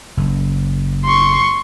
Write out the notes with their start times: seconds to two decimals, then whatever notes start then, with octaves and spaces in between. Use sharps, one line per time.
0.17 F#1
1.05 C6 C#6